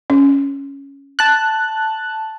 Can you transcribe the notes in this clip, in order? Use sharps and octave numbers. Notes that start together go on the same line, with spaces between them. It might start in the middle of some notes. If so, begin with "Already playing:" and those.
C#4
A5 F#6